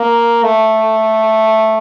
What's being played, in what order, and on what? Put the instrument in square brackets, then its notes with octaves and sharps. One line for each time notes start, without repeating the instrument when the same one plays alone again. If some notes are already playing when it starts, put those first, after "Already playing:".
Already playing: [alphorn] A#3
A3